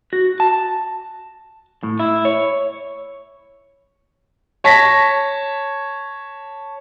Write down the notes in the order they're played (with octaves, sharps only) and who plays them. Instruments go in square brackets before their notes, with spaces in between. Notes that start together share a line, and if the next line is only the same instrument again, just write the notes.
[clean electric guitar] F#4
A5
A2
E4
C#5
[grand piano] C#5 A5 A#6 B6